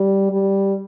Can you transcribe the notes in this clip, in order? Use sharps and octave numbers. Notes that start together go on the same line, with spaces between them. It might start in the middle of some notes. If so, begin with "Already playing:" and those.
Already playing: G3
G3